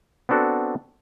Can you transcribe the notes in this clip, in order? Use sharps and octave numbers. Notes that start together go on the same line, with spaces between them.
B3 C4 D4 F#4 A4